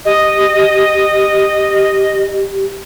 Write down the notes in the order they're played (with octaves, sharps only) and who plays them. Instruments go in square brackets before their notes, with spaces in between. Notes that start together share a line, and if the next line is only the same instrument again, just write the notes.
[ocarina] G4 [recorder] D#5